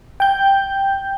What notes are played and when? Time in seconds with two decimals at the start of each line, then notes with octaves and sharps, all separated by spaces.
0.20 G5 G6